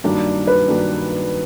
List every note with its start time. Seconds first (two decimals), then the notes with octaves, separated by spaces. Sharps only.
0.04 G2 D#3 F#3 A#3 D4
0.47 B4
0.68 G2 D#3 F#3 A#3 D4